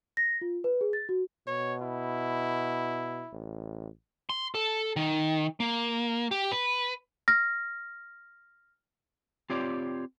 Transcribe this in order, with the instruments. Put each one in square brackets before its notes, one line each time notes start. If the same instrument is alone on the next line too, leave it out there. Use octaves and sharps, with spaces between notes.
[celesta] A#6
F4
B4
G#4
A6
F#4
[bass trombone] B2 [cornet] C#5
[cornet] E4
[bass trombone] A1
[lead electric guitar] C6
A4
D#3
A#3
G4
B4
[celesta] F6 A#6
[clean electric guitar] C4 F4 G4 C#5 D5